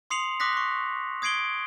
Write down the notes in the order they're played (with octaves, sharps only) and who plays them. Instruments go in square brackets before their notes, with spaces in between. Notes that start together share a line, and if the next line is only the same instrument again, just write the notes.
[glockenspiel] C6 D#6 C7 C#7 F7 F#7
C6 D6 D#6 F#6 A#6 B6
C#6 F#6
D#6 G#6 C7 D7 F#7 G7